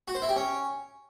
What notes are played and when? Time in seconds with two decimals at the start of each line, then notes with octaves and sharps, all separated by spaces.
0.08 F#4
0.15 C5
0.22 E4
0.29 G4
0.36 C#4